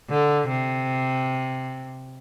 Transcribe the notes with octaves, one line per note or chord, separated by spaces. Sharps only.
D3
C3